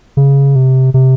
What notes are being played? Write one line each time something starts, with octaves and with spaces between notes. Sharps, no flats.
C#3
C3
C3